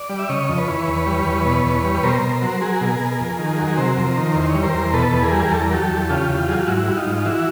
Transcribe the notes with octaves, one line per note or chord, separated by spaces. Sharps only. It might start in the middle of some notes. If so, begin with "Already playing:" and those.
Already playing: D5
G3
E5
C#3 C#5 D#5
F2
B4 C#5
E3
E2
G3
E2
B2
E2
G3
B2 A#4 C5
B2
F#3
F#3 G#4 A#4
B2
B2
F2
D#3
F#3
C3 A#4 C5
F2
D#3
E2 C5
C#5
G3
A#4 C5
E2
B2 A4 B4
E2
G#4 A#4
G3
E2 A4
A#4
F#3 G4 A4
E2
C#3 F4 G4
E2
F#3 G#4
G4
G#2 E4 F#4
G3
D#4 F4
G#2
E3 E4 F#4